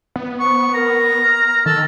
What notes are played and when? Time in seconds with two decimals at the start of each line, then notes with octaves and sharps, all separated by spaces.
0.16 B3
0.40 C5 C#6
0.74 A#4 A#5
1.23 F6
1.66 D#3 A4